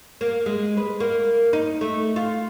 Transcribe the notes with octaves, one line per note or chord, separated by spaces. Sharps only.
A#3
G#3
B4
A#3
D#4
A3
F4